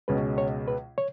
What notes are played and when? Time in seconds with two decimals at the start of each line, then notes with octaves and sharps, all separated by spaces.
0.08 C#2 B2 G#3 C#4 B4
0.38 C#5
0.68 B4
0.98 C#5